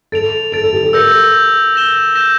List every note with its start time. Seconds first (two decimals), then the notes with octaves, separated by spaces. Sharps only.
0.12 A4 A6 D7 F7
0.52 A4 A6 D7 F7
0.64 A4
0.73 G4
0.83 A4
0.93 A#4 E6 G6 A#6
1.34 E6 G6 A#6
1.75 G6 A#6 E7 G7
2.15 G6 A#6 E7 G7